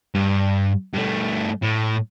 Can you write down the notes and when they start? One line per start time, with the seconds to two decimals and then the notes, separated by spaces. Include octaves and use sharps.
0.15 G2
0.94 G2 A3
1.63 A2